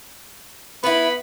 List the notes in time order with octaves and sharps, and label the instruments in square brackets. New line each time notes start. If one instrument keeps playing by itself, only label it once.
[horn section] B3 B5 [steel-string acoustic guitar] E4 B4